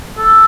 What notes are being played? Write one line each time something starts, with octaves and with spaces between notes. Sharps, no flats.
A4